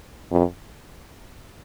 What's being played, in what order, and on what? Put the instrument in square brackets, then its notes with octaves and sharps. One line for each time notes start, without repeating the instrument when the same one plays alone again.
[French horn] F2